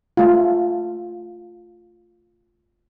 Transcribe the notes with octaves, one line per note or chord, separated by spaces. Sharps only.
A3 F4